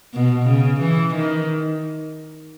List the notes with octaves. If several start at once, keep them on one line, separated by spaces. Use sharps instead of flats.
B2
C#3
E3
D#3